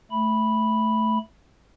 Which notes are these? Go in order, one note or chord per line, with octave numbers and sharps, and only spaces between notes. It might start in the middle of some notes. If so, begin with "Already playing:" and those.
A3 B5